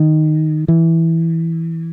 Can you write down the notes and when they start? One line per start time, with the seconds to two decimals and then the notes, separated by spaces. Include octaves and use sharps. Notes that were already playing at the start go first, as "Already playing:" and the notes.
Already playing: D#3
0.68 E3